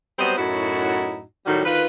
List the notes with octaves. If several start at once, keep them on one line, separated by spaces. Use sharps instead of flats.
F#3 G3 B3 C4 C5 D#5
F#2 A2 D#4 E4 F#4
A2 D#3 F#3 G3 F#4
D2 D#3 F4 B4